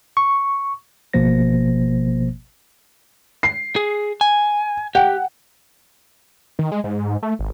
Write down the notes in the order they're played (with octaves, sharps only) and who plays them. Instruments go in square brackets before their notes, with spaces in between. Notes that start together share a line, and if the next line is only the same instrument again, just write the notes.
[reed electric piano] C#6
[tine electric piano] G#1 B2 F3 A#3 C5 A#6
[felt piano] C7
[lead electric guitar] G#4
G#5
[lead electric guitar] G4 [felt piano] F#5 G5
[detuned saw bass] D#3
G#3
G#2
A3
G#1